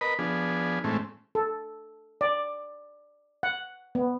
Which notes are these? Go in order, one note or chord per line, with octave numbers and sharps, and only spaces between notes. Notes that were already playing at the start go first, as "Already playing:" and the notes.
A#4 B4 D#5 B5
F3 B3 D4 G#4
A2 E3 G#3 A3 C4 C#4
A4
D5
F#5
B3